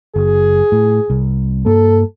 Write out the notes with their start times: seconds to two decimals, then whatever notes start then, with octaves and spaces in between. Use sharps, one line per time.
0.16 F#1 G#4
0.72 A2
1.10 C2
1.66 G2 A#3 A4